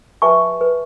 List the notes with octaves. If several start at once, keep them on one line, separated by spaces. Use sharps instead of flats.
G4 B4 E5 G#5 A5 C#6
B4